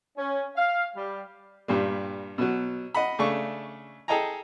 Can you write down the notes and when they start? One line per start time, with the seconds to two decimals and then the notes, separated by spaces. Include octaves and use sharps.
0.17 C#4
0.57 F5
0.96 G3
1.68 G2 A#2 G3
2.38 B2 F#3
2.94 D#5 F#5 B5
3.19 C#3 A3 D4 C#6
4.08 G#4 A4 D#5 G5 G#5 A#5